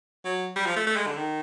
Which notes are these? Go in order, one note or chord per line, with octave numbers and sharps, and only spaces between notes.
F#3
G3
F3
A3
A3
G#3
D3
D#3